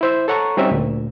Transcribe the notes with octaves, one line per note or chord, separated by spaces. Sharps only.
E4 C5 E5
A4 C#5 F#5 A#5 C#6
G3 C4 C#4 D#4 F#4 E5
D2 A#2